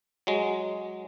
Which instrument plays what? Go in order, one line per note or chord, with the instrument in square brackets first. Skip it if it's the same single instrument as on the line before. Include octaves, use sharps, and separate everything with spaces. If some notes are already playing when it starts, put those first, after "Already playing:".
[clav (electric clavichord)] F#3 G#3